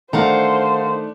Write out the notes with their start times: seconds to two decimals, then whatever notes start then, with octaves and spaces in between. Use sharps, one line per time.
0.13 D#3 A3 D4 C5 F5 F#5 A#5